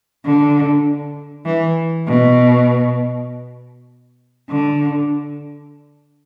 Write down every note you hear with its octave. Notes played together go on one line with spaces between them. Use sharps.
D3
E3
B2
D3